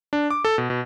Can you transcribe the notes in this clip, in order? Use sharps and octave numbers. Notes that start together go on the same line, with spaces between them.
D4
D6
A4
B2
B2